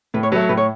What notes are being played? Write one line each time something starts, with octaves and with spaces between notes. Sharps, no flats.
A2 B4
C#5
F#3 A3 B4
C#5
A2 B4
C#5